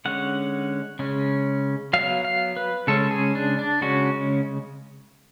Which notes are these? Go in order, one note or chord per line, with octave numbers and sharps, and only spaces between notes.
D3 G#3 C#4 F#5
C#3 G#3 C#4
F#3 B3 F5
F5
B4
C#3 G#3 C#4 A4
G#4
D4
D4
C#3 G#3 C#4 F#4